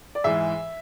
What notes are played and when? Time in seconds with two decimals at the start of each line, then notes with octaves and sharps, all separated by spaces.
0.15 D5
0.24 G#2 E3 G#3 E5